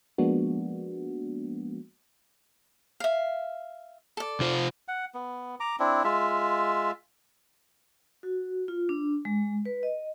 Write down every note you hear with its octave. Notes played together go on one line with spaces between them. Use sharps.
F3 G#3 A#3 B3 D4 F#4
E5 F5
A4 D5
C3 F4 C5
F#5
B3
A#5 D6
C4 D4 E4
G#3 F4 E5
F#4
F4
D4
G#3
B4
D#5